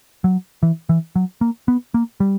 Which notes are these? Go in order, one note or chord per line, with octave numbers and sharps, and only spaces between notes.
F#3
E3
E3
F#3
A#3
B3
A#3
G3